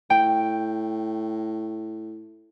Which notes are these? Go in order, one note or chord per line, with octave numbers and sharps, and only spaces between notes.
A2 G5